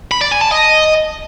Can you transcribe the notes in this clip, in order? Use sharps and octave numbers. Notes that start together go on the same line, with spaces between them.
B5
D5
G#5
A5
D#5